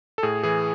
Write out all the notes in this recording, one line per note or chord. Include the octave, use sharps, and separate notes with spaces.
A4
A2 G#4
E3 G#4